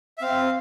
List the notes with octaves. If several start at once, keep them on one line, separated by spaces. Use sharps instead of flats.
E5
C4 F5